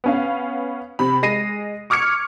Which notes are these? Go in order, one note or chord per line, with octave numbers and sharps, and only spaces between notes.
B3 C#4 F5
C3 B5
G#3 A#6 C7 D#7
C#6 D6 F6 G#6 C#7